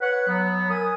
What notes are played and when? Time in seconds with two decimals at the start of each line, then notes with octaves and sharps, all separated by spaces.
0.01 B4 C#5 F#5
0.28 F#3 B3
0.70 A#4 G#5 D#6